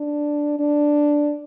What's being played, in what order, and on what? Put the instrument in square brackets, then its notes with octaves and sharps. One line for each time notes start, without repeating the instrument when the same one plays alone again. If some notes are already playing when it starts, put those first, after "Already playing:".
Already playing: [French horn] D4
D4